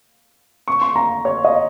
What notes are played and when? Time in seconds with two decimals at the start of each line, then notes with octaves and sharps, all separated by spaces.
0.68 C#6
0.82 C6
0.96 A#5
1.25 C#5
1.45 D#5